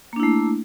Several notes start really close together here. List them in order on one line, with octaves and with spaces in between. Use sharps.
A#3 D4 E4 A3